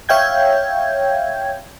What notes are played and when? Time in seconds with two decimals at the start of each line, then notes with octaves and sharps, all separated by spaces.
0.09 C#5 E5 F5 G5 G6 G#6